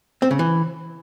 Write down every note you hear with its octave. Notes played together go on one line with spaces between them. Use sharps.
C4
C#3
E3